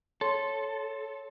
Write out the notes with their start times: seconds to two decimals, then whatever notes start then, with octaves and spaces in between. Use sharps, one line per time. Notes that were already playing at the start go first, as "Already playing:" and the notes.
0.21 A4 C#5 C6